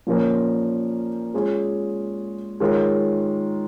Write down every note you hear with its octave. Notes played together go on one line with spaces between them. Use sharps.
A#2 F3 C#4 A#4
G#3 C#4 F4 G#4 C#5
D#3 G#3 F4 A#4 C#5